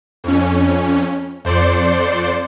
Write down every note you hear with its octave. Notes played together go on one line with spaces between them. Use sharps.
F2 C#4
F2 C5 D5 C6 C#7